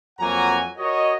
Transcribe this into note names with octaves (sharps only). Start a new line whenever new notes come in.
F2 F#3 A#3 F#5 G#5 A#5
F#4 A#4 C#5 D#5